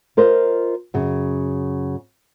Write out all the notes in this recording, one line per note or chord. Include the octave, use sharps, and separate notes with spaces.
F4 A#4 C5 D#5 F5
F#2 C#3